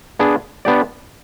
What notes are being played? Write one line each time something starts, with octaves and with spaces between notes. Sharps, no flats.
B3 D4 G#4
B3 D4 G4 D5